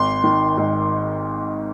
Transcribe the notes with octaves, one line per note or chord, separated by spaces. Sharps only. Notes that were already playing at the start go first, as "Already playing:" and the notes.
Already playing: G#1 C6
D#3
G#2